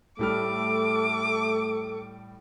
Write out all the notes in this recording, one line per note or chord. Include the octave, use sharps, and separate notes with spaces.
A2 G3 A3 A4 D6 F6